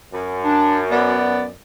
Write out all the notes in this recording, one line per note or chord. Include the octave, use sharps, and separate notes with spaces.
F#2
D4
B3 D5